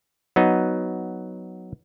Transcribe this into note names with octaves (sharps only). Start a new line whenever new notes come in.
F#3 B3 D#4